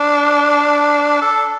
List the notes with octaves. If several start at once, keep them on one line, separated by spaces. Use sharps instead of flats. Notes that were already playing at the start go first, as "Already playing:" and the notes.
Already playing: D4
A4